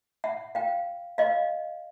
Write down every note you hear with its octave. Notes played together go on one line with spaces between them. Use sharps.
E5 F#5
F5 G5
D#5 F5